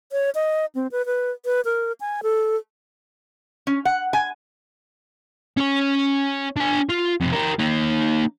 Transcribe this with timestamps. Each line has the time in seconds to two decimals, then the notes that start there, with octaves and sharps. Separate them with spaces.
0.12 C#5
0.35 D#5
0.75 C4
0.92 B4
1.06 B4
1.45 B4
1.65 A#4
2.01 G#5
2.23 A4
3.67 C#4
3.85 F#5
4.13 G#5
5.57 C#4 C#5
6.56 D4 G#5
6.89 F4
7.21 F2 C3
7.33 G4 A#4
7.60 A#3 D#4